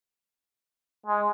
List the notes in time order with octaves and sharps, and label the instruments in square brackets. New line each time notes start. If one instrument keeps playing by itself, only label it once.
[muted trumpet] G#3